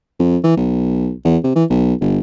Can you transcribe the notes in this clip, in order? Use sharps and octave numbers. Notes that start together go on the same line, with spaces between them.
F2
E3
B1
E2
C3
E3
B1
G1